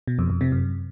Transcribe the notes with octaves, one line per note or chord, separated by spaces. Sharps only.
B2
F2
F2
C3
F#2